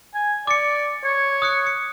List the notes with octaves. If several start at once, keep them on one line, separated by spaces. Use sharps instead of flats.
G#5
D5 D6 C#7
C#5
D#6 F#6 C#7
C#7